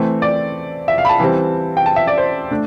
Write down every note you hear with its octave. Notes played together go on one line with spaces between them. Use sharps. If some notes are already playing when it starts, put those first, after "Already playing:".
Already playing: E3 A3 C4
D5
E5
F5
B5
A5
E3 G3 C4
G5
A5
E5
D5
C5
A3 D4